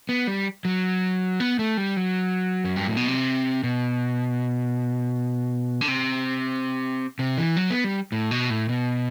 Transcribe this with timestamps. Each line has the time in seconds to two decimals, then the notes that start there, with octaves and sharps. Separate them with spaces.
0.09 B3
0.27 G3
0.65 F#3
1.40 B3
1.59 A3
1.77 G3
1.97 F#3
2.64 F#2
2.76 G2
2.87 A2
2.97 B2
3.08 C3
3.64 B2
5.81 D3
5.88 C3
7.19 C3
7.38 E3
7.56 F#3
7.71 B3
7.84 G3
8.12 A2
8.31 B2
8.50 A2
8.69 B2